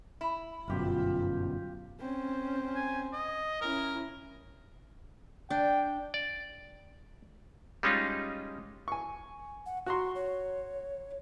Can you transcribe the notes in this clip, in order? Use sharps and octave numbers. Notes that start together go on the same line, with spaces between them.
E4
G1 F#2 B2 F4 G4
C4 C#4
G#5
D#5
C#4 E4 A#4
D4 G5
D5
G3 G#3 C#4 D#4 F4
G#5 C#6
F#5
F#4 A#5 C6 C#6
C#5